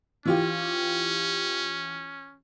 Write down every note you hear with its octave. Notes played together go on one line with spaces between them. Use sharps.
E3 C#4 F4 G4